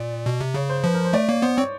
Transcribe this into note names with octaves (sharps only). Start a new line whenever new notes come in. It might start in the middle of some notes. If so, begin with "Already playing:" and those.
Already playing: A#2 D5
B2
C3
C#3 C#5
C5
F3 B4
A#4
C5
A3 D5
A#3 C#5
B3 C5
C4 C#5